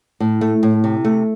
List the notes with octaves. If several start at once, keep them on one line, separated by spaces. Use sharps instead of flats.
A2
A3
A2
C3
A3